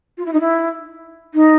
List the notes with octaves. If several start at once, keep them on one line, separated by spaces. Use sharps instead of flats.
F4
E4
D#4
E4
D#4